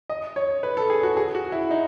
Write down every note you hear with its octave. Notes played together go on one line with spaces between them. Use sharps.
D#5
C#5
B4
A4
G#4
F#4
G#4
F#4
E4
D#4